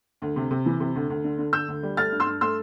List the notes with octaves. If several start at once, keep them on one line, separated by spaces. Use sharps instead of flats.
D2
C3
C3
E3
C3
D2
D2
D3
D3
D3 E6 G6
D2
G3
A3 F6 A6
G2
C6 E6
G2
A3 C6 E6